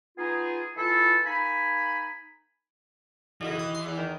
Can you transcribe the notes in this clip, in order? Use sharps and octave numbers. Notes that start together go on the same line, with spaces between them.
B3 D#4 F4 G#4
E3 E4 F4 A4
A#3 D#4 G#5 B5
B1 F#2 C#3 E3 D#5
D#2 D#6
C6
E2
D#3